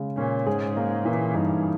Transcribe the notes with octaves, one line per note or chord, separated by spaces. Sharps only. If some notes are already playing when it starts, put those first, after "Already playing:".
Already playing: C#3 G#3
A#2 C#4
G#2 G#4
A#3
A#2 E3
G2 D#4